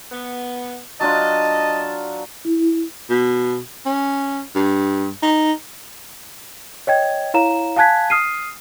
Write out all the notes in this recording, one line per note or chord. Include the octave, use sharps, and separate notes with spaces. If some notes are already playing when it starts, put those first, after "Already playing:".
B3
F#3 D4 F4 D#5 A5
E4
B2
C#4
G2
D#4
C#5 D#5 G5 G#6
E4 C#5 F5 A#5 E7
F5 G#5 A5 F#6 G#6 B6
D#6 F6 C7 D#7